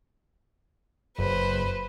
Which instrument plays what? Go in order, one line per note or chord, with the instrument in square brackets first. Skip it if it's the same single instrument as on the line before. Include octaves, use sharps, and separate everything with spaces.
[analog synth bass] F#1 [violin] B4 C5